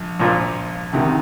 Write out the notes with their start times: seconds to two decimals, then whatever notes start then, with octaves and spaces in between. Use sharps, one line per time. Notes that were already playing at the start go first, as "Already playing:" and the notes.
Already playing: A#1
0.20 A#1 A#2 F3
0.93 D2 C3 D#3